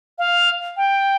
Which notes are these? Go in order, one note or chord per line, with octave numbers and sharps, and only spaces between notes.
F5
G5